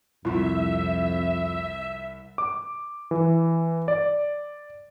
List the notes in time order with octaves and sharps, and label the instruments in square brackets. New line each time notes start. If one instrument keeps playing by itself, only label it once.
[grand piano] C2 [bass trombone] F2 [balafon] E4 F4 [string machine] E5
[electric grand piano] D6
E3
D5